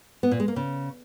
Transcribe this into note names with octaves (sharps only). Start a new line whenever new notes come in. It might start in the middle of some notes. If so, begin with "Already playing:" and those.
B3
A#2
G#3
A#3
C#3